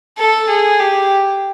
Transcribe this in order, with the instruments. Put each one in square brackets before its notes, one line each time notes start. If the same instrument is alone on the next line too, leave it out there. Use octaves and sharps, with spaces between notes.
[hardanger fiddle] A4
G#4
G4